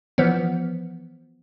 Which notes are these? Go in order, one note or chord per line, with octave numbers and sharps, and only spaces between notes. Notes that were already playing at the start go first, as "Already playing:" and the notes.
E3 F3 B3